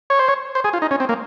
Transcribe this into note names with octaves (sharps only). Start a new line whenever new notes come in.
C#5
C5
C#5
C5
G#4
F4
D#4
C#4
C4
A#3